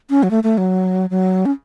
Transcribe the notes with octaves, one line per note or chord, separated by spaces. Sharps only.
C#4
F#3
A3
A3
F#3
F#3
C#4